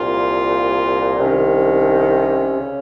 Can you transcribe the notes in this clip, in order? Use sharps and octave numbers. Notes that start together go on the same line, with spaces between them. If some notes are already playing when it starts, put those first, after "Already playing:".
Already playing: C2 A#2 F4
C2 C3 D#3 C#4
C#3